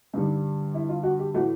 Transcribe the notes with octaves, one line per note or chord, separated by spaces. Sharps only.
G2 D3 G3 D#4
E4
F4
F#4
G4
A2 E3 A3 F#4